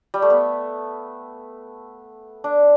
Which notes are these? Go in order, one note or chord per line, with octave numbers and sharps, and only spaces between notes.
G3
A3
B3
D4